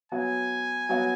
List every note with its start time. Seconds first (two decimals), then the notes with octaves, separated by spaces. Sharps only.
0.12 F#3 B3 F#4 G#5
0.89 F#3 B3 F#4